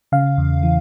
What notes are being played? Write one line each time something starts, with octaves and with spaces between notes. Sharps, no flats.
C#3 F5
E2
E3